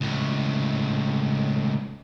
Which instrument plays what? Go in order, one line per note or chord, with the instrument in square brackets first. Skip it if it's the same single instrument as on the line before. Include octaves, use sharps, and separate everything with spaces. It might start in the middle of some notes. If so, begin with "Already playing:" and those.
[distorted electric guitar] C#2 A2